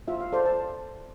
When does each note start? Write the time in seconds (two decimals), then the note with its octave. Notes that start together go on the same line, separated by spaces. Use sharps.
0.08 F4 E5
0.20 F5
0.32 A4 C5 D5
0.46 A5